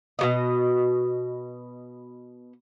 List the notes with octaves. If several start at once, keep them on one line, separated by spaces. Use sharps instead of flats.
B2 G3 D#5